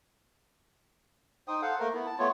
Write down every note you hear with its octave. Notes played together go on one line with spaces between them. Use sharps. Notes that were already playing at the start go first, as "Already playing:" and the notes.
D#4 C5 G5 D#6
A4 C5 F5 F#5
A3 A#3 A#4
B3 E4
A5
A3 B3 F4 C#5